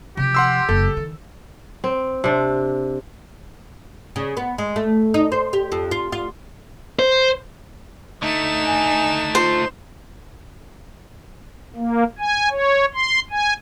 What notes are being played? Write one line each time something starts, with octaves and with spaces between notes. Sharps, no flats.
C3 F3 G4
F#5 C6 E6
F#1 A4
D#3
C4
C3 D4
C#3
B3
G#3
A3
D#4
C5
G4
F2
F4
F4
C5
D3 A3 D#4 E7
G#5
F4 C5
A#3
G#5
C#5
C6
G#5